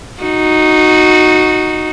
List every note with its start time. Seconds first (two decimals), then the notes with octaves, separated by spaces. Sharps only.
0.22 D#4 F#4